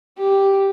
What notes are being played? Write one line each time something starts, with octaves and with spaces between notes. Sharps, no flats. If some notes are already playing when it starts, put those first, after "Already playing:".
G4